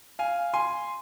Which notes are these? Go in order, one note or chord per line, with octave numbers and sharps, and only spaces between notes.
F5 G#5
G#5 C6